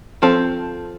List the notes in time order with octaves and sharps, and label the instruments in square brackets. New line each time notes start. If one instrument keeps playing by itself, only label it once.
[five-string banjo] F3 C4 A4 C5